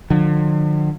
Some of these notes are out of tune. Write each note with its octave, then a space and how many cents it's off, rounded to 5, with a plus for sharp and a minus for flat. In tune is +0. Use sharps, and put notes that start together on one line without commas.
D3 +40 F3 +40